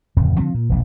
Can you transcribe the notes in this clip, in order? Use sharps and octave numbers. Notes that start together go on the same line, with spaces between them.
D1 F2 C#3
D3 F3 B3 C4
A#2
E1 A#1